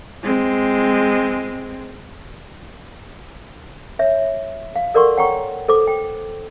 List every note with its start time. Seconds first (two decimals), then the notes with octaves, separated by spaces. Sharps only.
0.23 G#3 C4
3.99 C#5 E5
4.76 F5
4.94 A4 A#4 D5 F#5 C6 C#6
5.17 C#5 F#5 G5 A#5 C#6
5.68 A4 C5 D6
5.87 G5